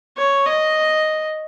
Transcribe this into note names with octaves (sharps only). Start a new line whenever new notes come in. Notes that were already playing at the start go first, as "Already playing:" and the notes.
C#5
D#5